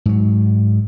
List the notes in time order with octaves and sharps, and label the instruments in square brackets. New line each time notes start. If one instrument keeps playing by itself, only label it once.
[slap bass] G#2 F#3